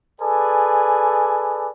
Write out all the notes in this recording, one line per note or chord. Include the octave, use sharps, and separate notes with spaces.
G#4 A4 B4 D5 G#5